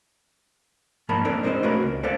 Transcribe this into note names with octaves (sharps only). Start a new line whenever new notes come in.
G#2 F3 A#3 A#4 A5 B5
A#3 C4 D#4 A4 A#4 D5
G#3 C4 D#4 G#4 C5 D#5
A3 A#3 C#4 F#4 A#4 B4
C#2
A4 B4 C5 D5 F5